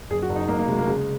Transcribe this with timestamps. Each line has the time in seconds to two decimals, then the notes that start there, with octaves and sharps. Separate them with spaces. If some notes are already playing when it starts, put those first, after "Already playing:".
0.10 F#1 G#4
0.22 F#4
0.29 F#1
0.36 D#4
0.48 F#1 A#3
0.59 A#3
0.68 C3 G#3
0.78 A#3
0.87 C#3 G#3